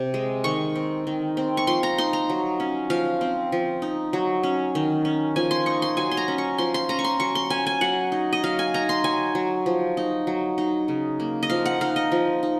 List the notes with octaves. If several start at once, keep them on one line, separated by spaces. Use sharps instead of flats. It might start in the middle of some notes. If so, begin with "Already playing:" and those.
Already playing: C3
G#3
D#3 C#6
C4
D#3
C4
C#6
F3 C6
A#5
D#4 C6
A#5
F#3
C#4
F3 F5
C4
F3
D#4
F#3
C#4
D#3
C#4
F3 G#5
C6
D#4 C#6
C6
F#3 G#5
C6
A#5
C#4
C#6
F3 C6
C6
C#4 A#5
C#6
C6
F#3 C#6
C6
C#4 G#5
G#5
F#3 F#5
D#4
D#5
F#3 F5
G#5
D#4 A#5
C6
F#3 G#5
F#3
F3
D#4
F#3
D#4
C#3
A#3
D#5
F3 F5
F#5
D#4 F5
D#5
F3
D#4